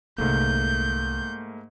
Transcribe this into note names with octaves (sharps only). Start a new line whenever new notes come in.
C2 G#2 D3 A3 A#3 G6